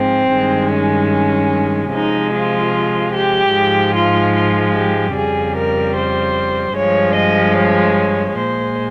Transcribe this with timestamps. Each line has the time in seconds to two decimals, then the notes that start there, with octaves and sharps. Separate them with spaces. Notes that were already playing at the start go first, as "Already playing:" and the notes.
Already playing: G#2 F3 G#3 C4
0.33 G2 D#3 G#3
0.73 C#4
1.94 C3 F3 G#3 D#4
2.34 F4
3.14 G4
3.55 G#2 F3 G#3
3.95 F4
4.35 F4
4.76 G4
5.16 F2 C#3 G3 G#4
5.56 A#4
5.96 C5
6.76 G2 F3 G#3 C#5
7.17 D#5
7.57 C#5
8.37 A#2 G#3 C5